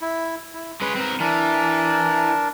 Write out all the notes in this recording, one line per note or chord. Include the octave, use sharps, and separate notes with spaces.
E4
E4
G#3 C#4 B4
C4 A#4
E3 D4 A#4 A5